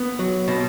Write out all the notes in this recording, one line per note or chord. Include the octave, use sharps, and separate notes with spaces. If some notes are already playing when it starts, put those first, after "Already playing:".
Already playing: B3
F#3
B2